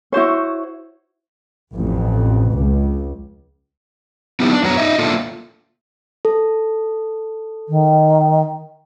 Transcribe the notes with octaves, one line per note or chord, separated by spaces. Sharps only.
E4 F#4 C5 C#5
A1 F2
C#2
B3 D#4 E4 G4
D4
F#2 B3 F#4 C#5 A#5
D#4 D#5 E5
A#3 D4 F4 A4 E5
A4
D#3